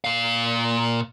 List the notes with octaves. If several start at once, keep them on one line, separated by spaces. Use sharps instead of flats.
A#2 F5